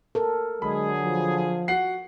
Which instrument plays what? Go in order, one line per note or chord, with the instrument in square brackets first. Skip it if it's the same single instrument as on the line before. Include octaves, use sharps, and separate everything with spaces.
[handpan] A4 A#4
[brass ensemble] D3 F#3 G#4 [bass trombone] G#3 [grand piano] B5
[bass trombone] F3
[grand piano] F#4 F#5 C7